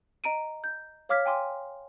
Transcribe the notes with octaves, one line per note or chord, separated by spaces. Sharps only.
D#5 A#5 D7 D#7
G6
C#5 F5 D6 F6 G#6 B6
G5 G#5 C6 D6